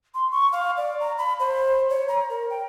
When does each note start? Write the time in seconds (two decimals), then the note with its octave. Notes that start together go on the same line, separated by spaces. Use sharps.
0.14 C6
0.31 C#6
0.52 F5
0.77 D5
1.00 A#5
1.18 B5
1.40 C5
1.90 C#5
2.08 A#5
2.30 A#4
2.50 G5